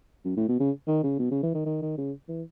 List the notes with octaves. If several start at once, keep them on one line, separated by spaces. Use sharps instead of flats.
F#2
A2
B2
C#3
D#3
C#3
B2
C#3
E3
D#3
D#3
D#3
C#3
E3